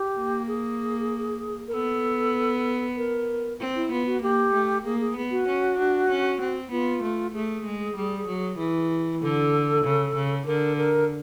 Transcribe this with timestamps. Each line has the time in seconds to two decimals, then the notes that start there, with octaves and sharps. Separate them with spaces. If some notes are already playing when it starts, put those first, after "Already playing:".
Already playing: G4
0.17 A#3
0.48 G#4
1.68 A#4
1.73 B3 A4
2.97 A#4
3.61 C4
3.75 E4
3.92 B3 F4
4.06 F#4
4.22 A#3 G4
4.53 A3
4.84 A#3 G#4
5.00 G#4
5.16 B3
5.31 F#4
5.47 C#4
5.78 D4
6.09 C#4
6.41 C4
6.71 B3 F4
7.03 A3
7.34 A3 G#4
7.66 G#3
7.96 G3
8.27 F#3
8.58 E3
9.22 D3 A4
9.84 C#3
10.15 C#3
10.46 D3 A#4
10.77 A#4